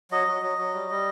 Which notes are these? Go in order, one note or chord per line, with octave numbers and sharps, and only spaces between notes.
F#3 D#5
F#3
F#3
F#3
G3
G3